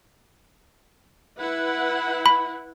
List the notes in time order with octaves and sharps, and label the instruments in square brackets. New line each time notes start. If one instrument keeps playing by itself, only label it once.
[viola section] E4 B4 F#5
[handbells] B5